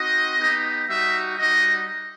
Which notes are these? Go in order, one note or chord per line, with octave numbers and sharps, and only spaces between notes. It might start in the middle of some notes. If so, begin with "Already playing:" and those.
Already playing: C4 D#4 F#4 D#5
B3 D#4 G4
G3 D#4 F#4 E5
G3 D#4 F#4 D#5